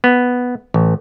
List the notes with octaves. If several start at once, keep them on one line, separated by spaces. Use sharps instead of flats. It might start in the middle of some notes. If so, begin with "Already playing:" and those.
B3
A1